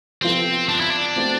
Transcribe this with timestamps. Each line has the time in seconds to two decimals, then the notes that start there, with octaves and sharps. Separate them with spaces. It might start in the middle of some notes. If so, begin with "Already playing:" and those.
0.22 C3 F3 B3 C4 F4 A4
0.69 D4
0.80 E4
0.90 D4
1.16 B2 A3 C4 F4